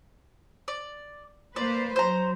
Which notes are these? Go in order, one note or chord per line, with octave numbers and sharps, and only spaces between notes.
D5
A#3 B4 C5 D5
F#3 C5 A#5